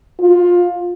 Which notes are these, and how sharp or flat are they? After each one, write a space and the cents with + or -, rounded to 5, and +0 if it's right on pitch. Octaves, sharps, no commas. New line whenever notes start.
F4 +20